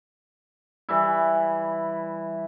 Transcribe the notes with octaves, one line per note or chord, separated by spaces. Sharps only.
E3 G3 E4